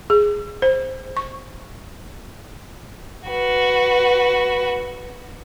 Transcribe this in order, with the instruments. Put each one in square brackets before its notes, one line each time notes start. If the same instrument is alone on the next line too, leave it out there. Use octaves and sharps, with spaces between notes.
[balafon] G#4
C5
C#6
[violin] F#4 B4